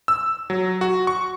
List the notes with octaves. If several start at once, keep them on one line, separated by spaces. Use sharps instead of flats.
E6
F#3
F#4
C#6